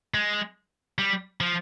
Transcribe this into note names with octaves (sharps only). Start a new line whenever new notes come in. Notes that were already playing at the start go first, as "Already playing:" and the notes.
G#3
G3
F3